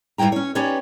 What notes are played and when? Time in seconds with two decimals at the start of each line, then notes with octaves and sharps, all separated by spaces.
0.18 G2 F#3 E4 G5 A#5
0.32 C#4 C#5
0.55 C#4 D#4 G4 B4 C#5 D5